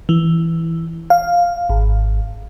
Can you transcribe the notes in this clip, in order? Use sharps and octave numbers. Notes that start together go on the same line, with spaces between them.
E3
F5
G#1